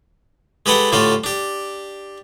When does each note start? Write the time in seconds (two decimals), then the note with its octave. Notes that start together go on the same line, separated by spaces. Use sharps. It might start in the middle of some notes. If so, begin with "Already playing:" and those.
0.66 G#3 G4 A4 B4 F#5 G5
0.92 A2 D3 A3 F4 G4 A4
1.24 D4 G4